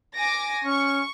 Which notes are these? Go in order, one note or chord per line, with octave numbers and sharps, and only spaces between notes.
G#5 D6 A#6
C#4 C#6